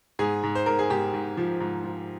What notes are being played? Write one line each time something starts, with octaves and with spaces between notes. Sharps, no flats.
G#2 G#4
G#2
C5
G#2 A#4
G#4
G#2 G4
G#2
F3
G#2
F3